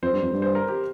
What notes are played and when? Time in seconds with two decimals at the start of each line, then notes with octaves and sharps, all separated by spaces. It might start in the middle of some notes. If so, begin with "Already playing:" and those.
0.02 F2 C5
0.13 G2
0.22 F2
0.32 G2
0.42 C5
0.55 A#4
0.68 G4